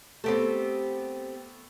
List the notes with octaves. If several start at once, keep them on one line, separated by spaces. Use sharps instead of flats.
A3 B3 C4 G4 A4